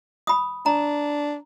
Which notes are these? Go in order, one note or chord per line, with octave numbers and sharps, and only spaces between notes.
B5 D#6
D4 A#5